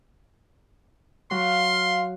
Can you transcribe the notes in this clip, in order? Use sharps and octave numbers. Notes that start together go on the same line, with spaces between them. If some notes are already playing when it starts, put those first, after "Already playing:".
F#3 F5 C6